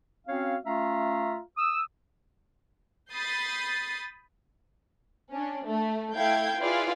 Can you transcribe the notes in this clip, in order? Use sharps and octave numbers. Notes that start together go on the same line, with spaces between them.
C4 C#4 F#4 C#5 F5
A3 C#4 F4 E5 F5 A#5
D#6 E6
B5 D#6 G6 A6 C7
C#4 D4
A3
A3 E4 F5 G5 G6 G#6
E4 F4 G#4 B4 D5 F5